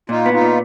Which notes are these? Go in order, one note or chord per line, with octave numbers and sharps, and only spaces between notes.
A#2 D#4 F4
B3
D#4 F4
A#2